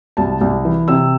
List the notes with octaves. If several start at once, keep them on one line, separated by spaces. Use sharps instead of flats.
C2 A5
C2
E3
C3 E6